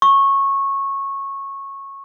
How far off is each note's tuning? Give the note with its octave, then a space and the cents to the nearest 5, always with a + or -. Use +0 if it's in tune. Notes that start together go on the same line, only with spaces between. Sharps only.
C#6 -15